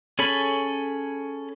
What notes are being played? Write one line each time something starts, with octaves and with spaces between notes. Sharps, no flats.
C#4 G#4 A4 C#5 B5